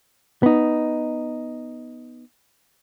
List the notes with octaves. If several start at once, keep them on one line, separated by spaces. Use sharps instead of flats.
B3 D#4